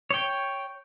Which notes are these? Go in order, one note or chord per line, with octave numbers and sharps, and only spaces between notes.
C#5 G5